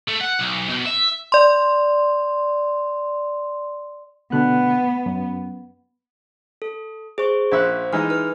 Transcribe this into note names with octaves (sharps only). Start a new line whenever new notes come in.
A3
F#5
B1
B2
E5
D5 C6
B2 D3 B3 F#6
F#2
A4
G#4 C5 C#6
A#1 C5 E5 F#6
E3 G#3 D#4 F6
B4 F6